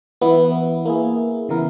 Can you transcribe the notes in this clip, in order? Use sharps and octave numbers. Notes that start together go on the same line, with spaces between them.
E3 B3 E4
A#3 E4 G#4
C#3 E3 B3 E4 A#4